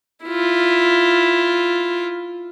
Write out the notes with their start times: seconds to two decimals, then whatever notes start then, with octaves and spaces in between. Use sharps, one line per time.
0.25 E4 F4